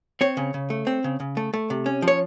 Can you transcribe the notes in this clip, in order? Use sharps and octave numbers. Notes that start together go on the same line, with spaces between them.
C4 C#5
C#3
C#3
A3
C4
C#3
C#3
A3
A3
C3
C#4
F3
C#5